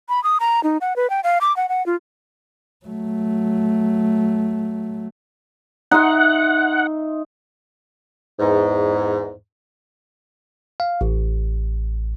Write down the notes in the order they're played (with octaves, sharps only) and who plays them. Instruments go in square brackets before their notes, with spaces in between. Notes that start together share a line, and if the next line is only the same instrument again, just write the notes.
[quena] B5
D#6
A#5
D#4
F#5
B4
G5
F5
D6
F#5
F#5
F4
[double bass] F#3 A3
[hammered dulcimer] D#4 E5 C6 [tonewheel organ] F#5
[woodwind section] E2 G#2
[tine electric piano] F5
A1